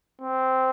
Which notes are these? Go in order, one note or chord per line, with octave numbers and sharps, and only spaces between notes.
C4